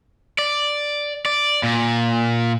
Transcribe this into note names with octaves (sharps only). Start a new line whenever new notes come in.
D5
D5
A#2